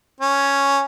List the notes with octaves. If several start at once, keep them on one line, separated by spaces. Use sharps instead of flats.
C#4